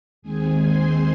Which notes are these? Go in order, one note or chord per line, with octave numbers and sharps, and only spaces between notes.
D#2 D#3 G#3 C4 G#4 G#5
C5 C6